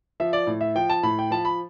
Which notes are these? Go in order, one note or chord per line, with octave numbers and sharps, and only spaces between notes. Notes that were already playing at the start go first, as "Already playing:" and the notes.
F3 E5
D5
A2
E5
F3 G5
A5
A2 B5
G5
F3 A5
B5